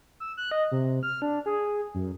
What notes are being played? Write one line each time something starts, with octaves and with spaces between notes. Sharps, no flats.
E6
F#6
D#5
C3
F6
D4
G#4
F#2